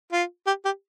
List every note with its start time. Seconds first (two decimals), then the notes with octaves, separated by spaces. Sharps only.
0.12 F4
0.47 G4
0.65 G4